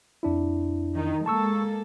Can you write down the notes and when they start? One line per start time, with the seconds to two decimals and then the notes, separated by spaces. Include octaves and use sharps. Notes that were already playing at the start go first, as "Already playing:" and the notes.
0.23 F2 D4 E4
0.95 D#3 D#4
1.26 G#3 A#3 A4 A5 C#6 E6